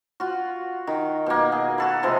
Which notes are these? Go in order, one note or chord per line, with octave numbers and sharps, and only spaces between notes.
F4 F#4
D#3
B2 A#3
G#4
F#4 A4 B4
C3 F3 G#3